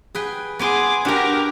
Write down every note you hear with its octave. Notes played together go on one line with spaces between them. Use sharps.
G#4 B4 G5
B3 G#4 G#5 C6 D6
D4 F#4 G4 A#4